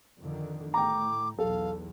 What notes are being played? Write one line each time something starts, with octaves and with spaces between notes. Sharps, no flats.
F2 D3 D#3
A2 G5 A#5 D6
B1 E2 A4 F5